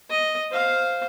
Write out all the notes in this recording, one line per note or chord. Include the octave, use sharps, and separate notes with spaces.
D#5
C5 F5